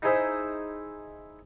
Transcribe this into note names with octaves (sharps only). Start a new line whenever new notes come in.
D#4 E4 G#4 C5 E5